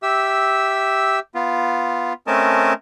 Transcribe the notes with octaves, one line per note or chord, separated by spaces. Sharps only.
G4 E5 E6
B3 F4
A3 C4 C#4 A#4 D#5 A5